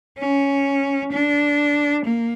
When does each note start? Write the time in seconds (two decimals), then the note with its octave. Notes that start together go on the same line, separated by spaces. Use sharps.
0.18 C#4
1.12 D4
2.05 A#3